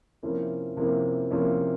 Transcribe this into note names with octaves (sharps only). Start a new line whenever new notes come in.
C3 F3 A#3 C#4 E4
C3 F3 A#3 C#4 E4
C3 F3 A#3 C#4 E4